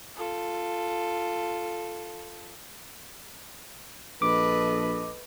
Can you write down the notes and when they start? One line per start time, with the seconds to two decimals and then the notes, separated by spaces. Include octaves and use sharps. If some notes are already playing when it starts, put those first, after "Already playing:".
0.15 F4 A4
4.22 A#1 A4 B4 D#5 D6